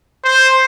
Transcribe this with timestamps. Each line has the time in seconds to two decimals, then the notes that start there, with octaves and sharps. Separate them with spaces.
0.24 C5